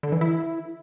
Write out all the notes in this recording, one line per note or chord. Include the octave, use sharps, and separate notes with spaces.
D3
E3
E4